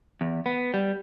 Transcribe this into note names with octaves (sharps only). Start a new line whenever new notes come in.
E2
B3
G3